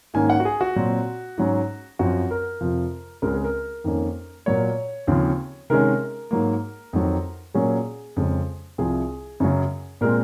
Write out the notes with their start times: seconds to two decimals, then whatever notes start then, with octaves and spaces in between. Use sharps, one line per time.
0.14 G#2 D#3 A#3 C#4 G#5
0.30 F#5
0.40 F#4
0.45 G#4
0.61 F#4
0.76 A#2 F#3 C4
1.38 G#2 F#3 C#4
1.99 F#2 F3 C4 F#4
2.31 A#4
2.61 F2 C3 F3
3.22 C#2 C#3 G#3 C4 A#4
3.34 G#4
3.44 A#4
3.84 F2 D#3 A#3 C#4
4.46 A#2 F#3 A#3 C#5
5.07 D#2 C#3 F3 C4
5.70 C3 D#3 G#3 C#4 A#4
6.31 G#2 F#3 A#3
6.93 F2 D#3 F#3
7.54 A#2 F#3 A#3 C#4 G#4
8.16 F2 C#3 G#3
8.78 C2 C3 F3 C4 G#4
9.40 F#2 C#3 F#3
10.01 A#2 G#3 C4 A#4